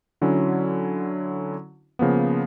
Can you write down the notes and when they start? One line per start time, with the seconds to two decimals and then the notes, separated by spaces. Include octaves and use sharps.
0.22 D3 F#3 C#4 E4
1.99 C#3 F3 A#3 B3